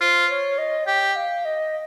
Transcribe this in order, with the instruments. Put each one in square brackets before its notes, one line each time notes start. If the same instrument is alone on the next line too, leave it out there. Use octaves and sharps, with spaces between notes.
[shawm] F4 [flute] C5
[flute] C#5
D#5
[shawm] G4 [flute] G5
[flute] F5
D#5